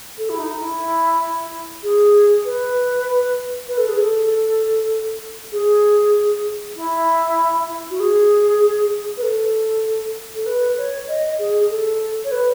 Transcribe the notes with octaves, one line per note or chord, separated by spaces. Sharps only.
A4
E4
D#4
E4
G#4
B4
B4
A4
G#4
A4
G#4
E4
F#4
G#4
B4
A4
A4
B4
C#5
D#5
G#4
A4
C#5
B4